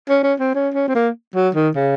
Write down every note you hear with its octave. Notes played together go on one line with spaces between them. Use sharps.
C#4
C#4
C4
C#4
C#4
C4
A#3
F#3
D#3
C#3